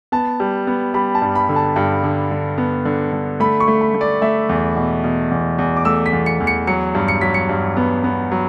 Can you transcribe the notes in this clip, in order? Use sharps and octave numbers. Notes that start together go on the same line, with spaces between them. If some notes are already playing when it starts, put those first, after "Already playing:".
B3 A5
G3
B3
G3 B5
A5
G2
B5
D3
A5
G2 G5
D3
D3
B3
D3
D3
A3 B5
C#6
A3
B5
A3
D5
A3 E5
E2
B2
B2
E2
E2
D6
A3 E6
B6
E2
C#7
E2
C#7
F#3 C#7
G2
C#7
F#3 B6
C#7
G2
B3
B3
F#3